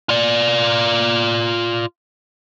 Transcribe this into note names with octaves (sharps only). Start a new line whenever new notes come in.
F4 D5